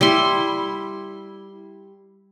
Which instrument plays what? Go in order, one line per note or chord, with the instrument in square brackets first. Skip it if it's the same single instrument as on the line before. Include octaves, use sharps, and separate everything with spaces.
[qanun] G3 E4 C6